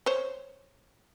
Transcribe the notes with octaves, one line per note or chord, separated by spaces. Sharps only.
C5 C#5